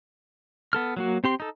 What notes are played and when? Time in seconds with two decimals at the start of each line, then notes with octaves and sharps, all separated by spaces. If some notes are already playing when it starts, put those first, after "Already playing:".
0.73 B3 A4 F6
0.97 F#3 A#3 F#4
1.24 C4 G4 C6
1.40 D#4 A4